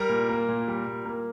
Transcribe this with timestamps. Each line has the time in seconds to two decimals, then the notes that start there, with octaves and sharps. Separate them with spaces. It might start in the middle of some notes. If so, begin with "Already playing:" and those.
Already playing: G3 A#4 A#5
0.09 A#2
0.29 A#3
0.49 A#2
0.68 G3
0.87 A#2
1.05 A#3